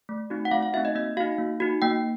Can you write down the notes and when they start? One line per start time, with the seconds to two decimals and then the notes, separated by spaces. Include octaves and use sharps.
0.09 A3
0.30 C4 D#4 F#4
0.45 F#5
0.51 A3 F5
0.63 F5
0.73 C4 D#4 F#4 E5
0.85 D#5
0.95 A#3 D#5
1.17 D#4 F#4 F5
1.38 A#3
1.60 D#4 F#4
1.82 A#3 G5